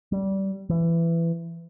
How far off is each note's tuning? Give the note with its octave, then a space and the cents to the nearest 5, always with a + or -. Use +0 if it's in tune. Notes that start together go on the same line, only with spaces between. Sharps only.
G3 -20
E3 +20